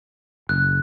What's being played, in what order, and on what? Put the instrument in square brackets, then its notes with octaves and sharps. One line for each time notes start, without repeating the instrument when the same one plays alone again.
[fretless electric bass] F#1 [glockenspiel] F#6